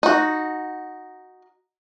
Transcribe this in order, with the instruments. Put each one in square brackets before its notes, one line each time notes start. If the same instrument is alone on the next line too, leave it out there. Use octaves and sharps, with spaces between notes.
[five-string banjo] D#4 F#4